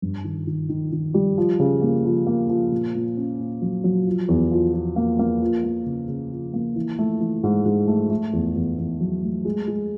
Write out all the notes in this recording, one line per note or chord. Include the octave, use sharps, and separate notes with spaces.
G2
D#3
D#3
D#3
D#3
G3
F3
C#3
A#3
F3
A#3
F3
A#2
A#2
C#4
A#2
F#3
F#3
F3
E2
F3
F3
A#3
A#3
F3
A#3
C#3
C#3
F3
A#3
E3
A3
E3
G#2
G#2
A3
A3
E2
E2
E2
F#3
A3
G#3
G#3